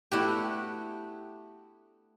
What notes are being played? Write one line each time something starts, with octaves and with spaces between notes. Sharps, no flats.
A3 B3 D4 E4 F#4 G4